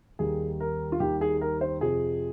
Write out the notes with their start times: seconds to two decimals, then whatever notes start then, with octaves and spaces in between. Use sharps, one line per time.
0.19 D#2 D#3 G3 G#4
0.60 A#4
0.92 F4
1.00 D#2 D#3 G3 G4
1.21 G#4
1.41 A#4
1.61 C5
1.81 F2 C3 F3 G#4